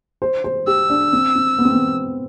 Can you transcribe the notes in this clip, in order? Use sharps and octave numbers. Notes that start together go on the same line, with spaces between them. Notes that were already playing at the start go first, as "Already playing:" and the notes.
C5
C5
G4 E6
D4
C4
C4
B3
C4
B3